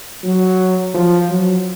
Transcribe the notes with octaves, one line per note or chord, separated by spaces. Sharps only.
F#3
F3
F#3